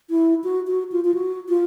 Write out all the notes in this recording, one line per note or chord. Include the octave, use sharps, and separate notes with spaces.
E4
F#4
F#4
F4
F4
F#4
F4